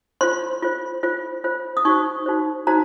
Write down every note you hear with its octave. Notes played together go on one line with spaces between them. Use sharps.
F4 C5 C6
F4 C5
F4 C5
F4 C5
D#6
D#4 F#4 C5 C#6
D#4 F#4 C5
D#4 F#4 C5 A#5